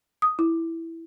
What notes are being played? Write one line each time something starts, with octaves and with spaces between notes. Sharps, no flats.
D#6
E4